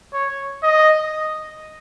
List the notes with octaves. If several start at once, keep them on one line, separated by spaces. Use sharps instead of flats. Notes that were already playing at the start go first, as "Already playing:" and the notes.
C#5
D#5